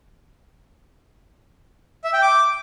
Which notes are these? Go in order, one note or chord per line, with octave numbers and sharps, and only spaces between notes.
E5
G5
D6